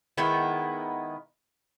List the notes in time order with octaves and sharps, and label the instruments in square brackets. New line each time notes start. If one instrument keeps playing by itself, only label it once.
[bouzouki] D#3 G#3 B3 E4